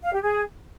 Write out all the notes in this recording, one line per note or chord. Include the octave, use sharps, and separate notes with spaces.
F5
G4
G#4